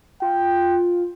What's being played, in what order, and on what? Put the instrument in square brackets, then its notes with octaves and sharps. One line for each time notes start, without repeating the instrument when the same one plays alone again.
[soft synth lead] F4 [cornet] G5